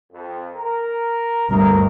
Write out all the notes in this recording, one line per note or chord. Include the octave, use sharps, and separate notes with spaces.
F2
A#4
G1 D2 A#4